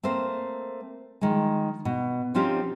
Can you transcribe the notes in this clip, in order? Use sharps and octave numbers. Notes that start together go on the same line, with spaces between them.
A3 A#3 C4 C5
D#3 F3 G#3
B2
F3 C4 C#4 D#4 F4 G4